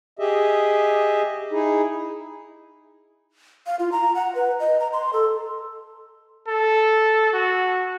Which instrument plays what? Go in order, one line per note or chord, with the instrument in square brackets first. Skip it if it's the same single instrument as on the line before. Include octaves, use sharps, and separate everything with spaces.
[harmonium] G4 G#4 D#5 E5
D#4 E4 G#4
[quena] F5
F4
A#5
F#5
B4
D#5
A#5
C6
A4
[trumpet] A4
F#4